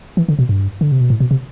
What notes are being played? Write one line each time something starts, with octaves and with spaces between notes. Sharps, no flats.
E3
D3
B2
G2
D3
C3
B2
A2
B2
C3